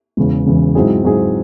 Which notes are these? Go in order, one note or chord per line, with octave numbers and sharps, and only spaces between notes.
E1 E2 C#3
E1 E2 C#3
G#2 F#3 C4 E4 G#4
G#2 F#3 C4 E4 G#4